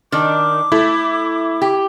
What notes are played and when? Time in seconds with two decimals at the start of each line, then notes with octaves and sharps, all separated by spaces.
0.12 D#3 D4 D6
0.72 A3 E4
1.62 G4